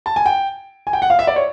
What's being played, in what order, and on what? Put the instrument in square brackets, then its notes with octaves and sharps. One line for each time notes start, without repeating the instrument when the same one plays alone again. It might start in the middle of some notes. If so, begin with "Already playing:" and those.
[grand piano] A5
G#5
G5
G#5
G5
F#5
F5
E5
D5
C#5